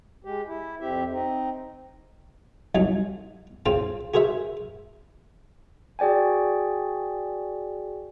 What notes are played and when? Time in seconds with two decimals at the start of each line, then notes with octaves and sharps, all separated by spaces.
0.25 G#3 G4
0.47 E4
0.80 F2 C4 G4 E5
1.12 C4 D#4
2.75 C2 F#3 D#4 G#5
3.66 C#3 C4 F4 F5 G5
4.14 F#4 G#4 A#4 C5 E5
5.99 F#4 G#4 D5 G5 G#5